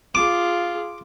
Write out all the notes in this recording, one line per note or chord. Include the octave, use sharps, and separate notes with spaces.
F4 G#4 D6